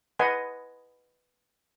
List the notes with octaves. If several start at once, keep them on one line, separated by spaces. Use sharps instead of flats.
B4 D#5 F#5 G#5 C6